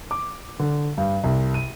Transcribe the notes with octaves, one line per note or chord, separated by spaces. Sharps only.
D6
D3
G2
C2
D#7